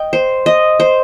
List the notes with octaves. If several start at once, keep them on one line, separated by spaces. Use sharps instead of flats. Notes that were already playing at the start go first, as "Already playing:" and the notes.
Already playing: D#5 G5
C5
D#5
C5